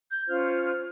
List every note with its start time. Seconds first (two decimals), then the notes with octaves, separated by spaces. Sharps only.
0.10 G6
0.28 C#4 F4 C5 F6